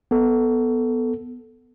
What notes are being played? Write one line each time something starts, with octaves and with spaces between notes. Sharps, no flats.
B3 A4